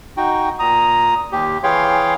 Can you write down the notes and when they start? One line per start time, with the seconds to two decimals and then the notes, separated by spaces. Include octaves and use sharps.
0.17 D#4 F#4 G5
0.59 A#2 A#5 D#6
1.32 D#2 G4
1.63 E3 G#4 C#5 F5 G5 C6